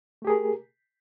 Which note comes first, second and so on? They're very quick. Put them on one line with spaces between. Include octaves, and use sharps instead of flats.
A3 G4 G#4 A#4